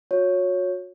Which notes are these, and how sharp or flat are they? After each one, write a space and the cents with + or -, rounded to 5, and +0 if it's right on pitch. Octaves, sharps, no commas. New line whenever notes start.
F#4 -35 C#5 +0